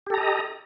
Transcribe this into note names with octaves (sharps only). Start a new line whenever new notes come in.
G4 A4 D#5 A#5